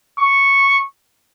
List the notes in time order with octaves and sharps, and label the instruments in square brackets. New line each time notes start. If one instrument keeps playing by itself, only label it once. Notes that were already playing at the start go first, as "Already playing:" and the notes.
[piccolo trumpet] C#6